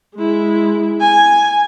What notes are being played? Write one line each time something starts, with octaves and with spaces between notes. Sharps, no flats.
G#3 E4
G#5